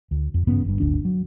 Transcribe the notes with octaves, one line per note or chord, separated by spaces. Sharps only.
D2
F2
A1 G2 C#3 B3
G1 G2
D1 G1 D2 D4
F#3